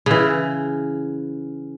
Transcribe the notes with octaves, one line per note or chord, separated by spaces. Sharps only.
C#3 E3